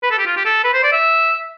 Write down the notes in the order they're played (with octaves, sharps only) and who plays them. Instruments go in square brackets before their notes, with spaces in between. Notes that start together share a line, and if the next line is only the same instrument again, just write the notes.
[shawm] B4
A4
G4
F4
G4
A4
B4
C5
D5
E5